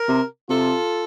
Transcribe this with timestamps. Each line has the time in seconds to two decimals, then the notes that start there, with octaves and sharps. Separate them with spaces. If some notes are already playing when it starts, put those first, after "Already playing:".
Already playing: A#4
0.08 C3
0.49 C3 F4 A4